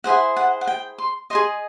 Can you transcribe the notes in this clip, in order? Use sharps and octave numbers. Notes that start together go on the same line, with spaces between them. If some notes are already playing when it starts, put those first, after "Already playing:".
E4 G#4 C5 F#5
F#5
F#5
G5
C6
G#4 C5 D#5 C6